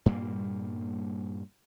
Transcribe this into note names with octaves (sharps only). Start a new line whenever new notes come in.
G2 A#2 G3 A#3